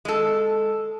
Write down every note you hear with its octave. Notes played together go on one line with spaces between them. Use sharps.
G#3 A4